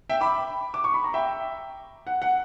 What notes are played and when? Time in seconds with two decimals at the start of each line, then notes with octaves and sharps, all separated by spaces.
0.09 E5 G5
0.21 B5 D6
0.74 D6
0.84 C#6
0.94 B5
1.04 A#5
1.14 E5 G5
2.07 F#5
2.22 F#5